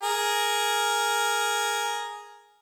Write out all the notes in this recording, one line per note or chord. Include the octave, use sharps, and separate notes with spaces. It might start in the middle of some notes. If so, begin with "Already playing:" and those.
G#4 A#4